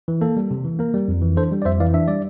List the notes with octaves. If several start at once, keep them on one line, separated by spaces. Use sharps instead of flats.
E3
A#3 A4
G3
C3
E3
A#3 A#4
G3
F2
E3
D4 A4 C5
G3
D5
F2 C5 E5
E3 D5 F5
D4 E5
G3 D5